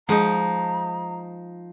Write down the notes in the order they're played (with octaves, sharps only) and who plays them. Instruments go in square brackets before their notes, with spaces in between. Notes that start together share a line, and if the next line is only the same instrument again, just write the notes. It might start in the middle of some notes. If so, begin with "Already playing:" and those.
[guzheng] F3 D#4 [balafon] G#3 G#4 [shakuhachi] A#5